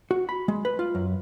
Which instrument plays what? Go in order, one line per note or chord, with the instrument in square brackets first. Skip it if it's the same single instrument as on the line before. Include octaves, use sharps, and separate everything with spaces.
[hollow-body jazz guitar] F#4
B5
G#3
B4
F4
F#2